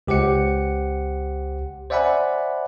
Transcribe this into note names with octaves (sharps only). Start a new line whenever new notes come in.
C#2 G4 C5 F#5 C#7
C5 D5 E5 F#5 G#5 B5